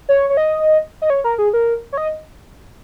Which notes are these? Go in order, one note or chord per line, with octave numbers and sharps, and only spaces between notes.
C#5
C#5
D#5
D#5
C#5
A#4
G#4
A#4
C#5
D#5